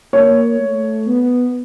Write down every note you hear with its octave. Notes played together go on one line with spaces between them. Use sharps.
A#3 C#5
A3
B3